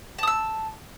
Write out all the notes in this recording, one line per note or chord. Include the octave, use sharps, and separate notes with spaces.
A5 D#6 E6